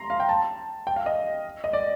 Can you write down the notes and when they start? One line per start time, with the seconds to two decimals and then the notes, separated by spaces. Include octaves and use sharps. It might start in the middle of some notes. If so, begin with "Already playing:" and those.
Already playing: A#5 C6
0.10 F5
0.20 G5
0.29 A5
0.87 G5
0.96 F5
1.06 D#5
1.64 D#5
1.73 D5